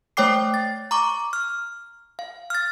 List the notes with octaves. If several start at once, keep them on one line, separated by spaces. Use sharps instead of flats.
A3 C5 C#5 G5 D6 C7
A6
A#5 C#6 D6
F6
F5
F6 A6